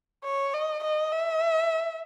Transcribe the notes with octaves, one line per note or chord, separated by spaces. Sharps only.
C#5
D#5
D#5
E5